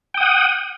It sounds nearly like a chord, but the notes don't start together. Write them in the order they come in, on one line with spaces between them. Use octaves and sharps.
G5 D#6 F#5